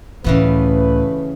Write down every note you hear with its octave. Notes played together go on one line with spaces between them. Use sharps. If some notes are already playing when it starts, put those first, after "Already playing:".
C#2 A2 C#3 E3 A3 B3 B4